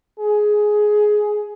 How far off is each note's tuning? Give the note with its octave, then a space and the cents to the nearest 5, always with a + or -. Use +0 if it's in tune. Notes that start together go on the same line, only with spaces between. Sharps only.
G#4 +10